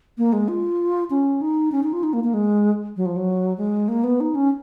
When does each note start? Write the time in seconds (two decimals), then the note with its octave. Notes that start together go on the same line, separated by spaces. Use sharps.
0.18 A#3
0.33 G#3
0.48 F4
1.10 C#4
1.41 D#4
1.72 C#4
1.83 D#4
1.93 F4
2.03 D#4
2.13 A#3
2.24 A#3
2.34 G#3
2.97 F#3
3.06 F3
3.16 F#3
3.57 G#3
3.88 A#3
4.04 B3
4.20 D#4
4.35 C#4